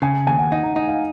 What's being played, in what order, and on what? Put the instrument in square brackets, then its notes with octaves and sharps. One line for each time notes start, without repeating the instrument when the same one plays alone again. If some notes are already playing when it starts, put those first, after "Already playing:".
[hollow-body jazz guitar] C#3 [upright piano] G#5
[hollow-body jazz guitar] D#2 [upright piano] G#5
[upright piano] F#5
[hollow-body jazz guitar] D#4 [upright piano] F#5
[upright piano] A#5
[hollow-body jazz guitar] D#4 [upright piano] F#5
[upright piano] F5